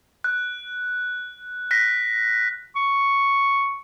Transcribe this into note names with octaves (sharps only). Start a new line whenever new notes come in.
F#6
F#6 A#6 B6
C#6